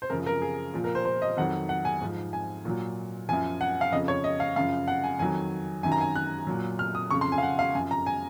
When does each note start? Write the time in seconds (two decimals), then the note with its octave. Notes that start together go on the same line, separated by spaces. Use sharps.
0.02 C5
0.10 F#2 C#3 F3 A#4
0.26 A#4
0.42 G#4
0.74 A#2 F3
0.84 A#4
0.95 C5
1.05 C5
1.22 D#5
1.37 F2 D#3 F#3 F#5
1.69 F#5
1.85 G#5
2.01 G#2 F3
2.33 G#5
2.65 A#2 F#3
3.29 F#2 F3 G#5
3.61 F#5
3.81 F5
3.92 F2 C#3 F3 D#5
4.08 C#5
4.24 D#5
4.40 F5
4.56 F#2 C#3 F3 F5
4.88 F#5
5.04 G#5
5.19 F2 D#3 F#3 G#5
5.83 F#2 D#3 F#3 G#5
5.92 A#5
6.01 G#5
6.15 F#6
6.47 A#2 F#3
6.79 F6
6.95 D#6
7.11 F2 C#3 F3 C#6
7.21 C6
7.32 G#5
7.38 F5
7.43 F#5
7.59 F5
7.74 F#2 G#5
7.78 F3
7.91 A#5
8.06 G#5